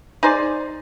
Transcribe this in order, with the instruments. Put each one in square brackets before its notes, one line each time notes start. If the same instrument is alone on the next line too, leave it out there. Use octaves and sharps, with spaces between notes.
[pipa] D#4 G#4 C5 D5